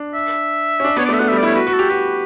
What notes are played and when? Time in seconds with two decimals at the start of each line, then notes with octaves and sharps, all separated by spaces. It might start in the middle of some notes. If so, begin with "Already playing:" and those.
Already playing: D4
0.14 E5
0.80 C#4
0.84 D4
0.97 B3 C#5
1.05 D5
1.09 A3
1.13 E5
1.19 A3 F#5
1.28 E5
1.32 G3
1.38 D5
1.43 E4 C#5
1.55 F#4 B4
1.67 F#4
1.73 A4
1.79 G4
1.90 F#4 B4